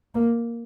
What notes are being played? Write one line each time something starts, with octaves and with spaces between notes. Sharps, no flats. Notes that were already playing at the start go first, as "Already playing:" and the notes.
A#3